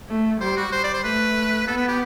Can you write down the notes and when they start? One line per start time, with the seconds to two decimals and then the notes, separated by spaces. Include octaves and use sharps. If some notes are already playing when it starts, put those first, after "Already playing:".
0.09 A3
0.41 G3 C5
0.57 F#4
0.73 G3 C5
0.84 D5
0.94 C5
1.04 A3 B4
1.67 B3 A4
1.77 B4
1.88 G4